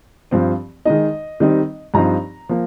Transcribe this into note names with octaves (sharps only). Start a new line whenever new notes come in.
G2 F3 C4
D#3 G#3 D#4 D#5
D#3 G3 C4 D#4
G2 F3 C4 D#4 A#5
F3 A#3